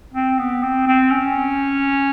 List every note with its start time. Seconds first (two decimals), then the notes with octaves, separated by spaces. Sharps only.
0.14 C4
0.39 B3
0.63 C4
0.87 C4
1.11 C#4